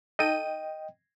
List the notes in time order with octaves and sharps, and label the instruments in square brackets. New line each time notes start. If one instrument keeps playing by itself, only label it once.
[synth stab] D#4 A4 D#7 [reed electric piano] D#5 G5